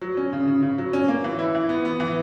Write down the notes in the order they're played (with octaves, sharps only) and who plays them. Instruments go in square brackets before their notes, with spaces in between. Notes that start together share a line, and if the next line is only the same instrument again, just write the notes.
[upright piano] F#3
C#4
C#3
C#3
C#3
F#3
C#4
A#3
E3
E4
E3
B3
B3
E3